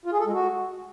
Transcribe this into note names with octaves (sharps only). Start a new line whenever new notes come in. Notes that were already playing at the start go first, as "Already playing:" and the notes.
F4
G#4
A4
G#3
F#4